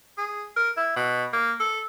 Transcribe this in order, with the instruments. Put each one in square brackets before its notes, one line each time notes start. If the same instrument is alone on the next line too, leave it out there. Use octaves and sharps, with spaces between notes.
[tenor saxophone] G#4
A#4
E4
B2
A#3
A4